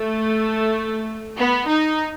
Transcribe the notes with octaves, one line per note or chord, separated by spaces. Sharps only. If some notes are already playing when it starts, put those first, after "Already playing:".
Already playing: A3
B3
D#4